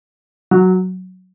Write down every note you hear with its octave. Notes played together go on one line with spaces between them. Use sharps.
F#3